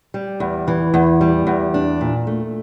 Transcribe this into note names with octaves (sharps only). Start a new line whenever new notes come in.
G3
E2
E3
E2
G3
E2
D4
A#2
A3